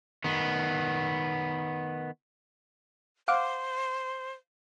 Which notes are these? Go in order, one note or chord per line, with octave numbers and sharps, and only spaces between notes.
D#3 B3
C5 F5 F#5 D6